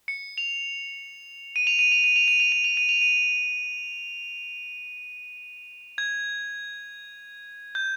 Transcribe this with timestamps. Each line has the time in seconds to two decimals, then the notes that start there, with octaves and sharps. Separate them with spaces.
0.08 C#7
0.38 F7
1.56 D#7
1.67 F7
1.79 D#7
1.92 F7
2.04 D#7
2.16 F7
2.28 D#7
2.40 F7
2.52 D#7
2.64 F7
2.77 D#7
2.89 F7
3.01 D#7
5.98 G#6
7.75 G6